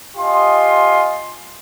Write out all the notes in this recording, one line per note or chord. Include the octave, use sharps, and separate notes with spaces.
F4 G4 D#5 G#5 C6